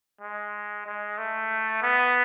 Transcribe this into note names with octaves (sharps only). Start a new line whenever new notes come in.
G#3
G#3
A3
B3